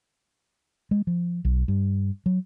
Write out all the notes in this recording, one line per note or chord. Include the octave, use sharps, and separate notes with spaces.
G#3
F3
B1
G2
F#3